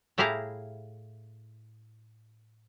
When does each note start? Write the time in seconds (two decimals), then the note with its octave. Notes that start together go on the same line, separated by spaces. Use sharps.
0.18 A2 E4 G4 G#4 F5 A#5